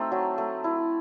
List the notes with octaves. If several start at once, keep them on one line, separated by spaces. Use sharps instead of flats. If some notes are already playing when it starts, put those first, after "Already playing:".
Already playing: A3 C4 D#4 F#4 A4 C5
F#3
A3
E4